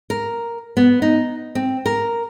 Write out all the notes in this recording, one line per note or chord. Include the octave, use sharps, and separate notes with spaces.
A#4
B3
D#4
C4
A#4